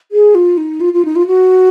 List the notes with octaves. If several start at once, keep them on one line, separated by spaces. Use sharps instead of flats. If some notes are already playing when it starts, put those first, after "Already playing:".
G#4
F4
D#4
F4
F4
D#4
F4
F#4